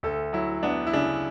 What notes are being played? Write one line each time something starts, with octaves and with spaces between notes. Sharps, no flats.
D2 A4
F#3 E4
B3 D4
E4
C#3 D4